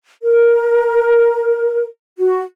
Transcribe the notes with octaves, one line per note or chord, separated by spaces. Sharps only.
A#4
F#4